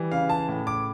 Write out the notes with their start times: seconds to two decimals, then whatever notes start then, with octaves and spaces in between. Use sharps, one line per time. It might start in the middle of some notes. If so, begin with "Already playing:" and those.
Already playing: E3 G3
0.11 C#3 F5
0.29 A5
0.48 A2
0.67 D6